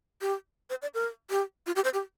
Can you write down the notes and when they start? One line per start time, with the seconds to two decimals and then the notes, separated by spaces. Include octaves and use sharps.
0.21 G4
0.70 C5
0.82 D5
0.94 A#4
1.30 G4
1.67 F4
1.76 G4
1.84 C5
1.94 G4